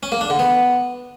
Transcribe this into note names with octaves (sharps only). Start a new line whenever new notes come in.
C#4
A#3
D4
D3
B3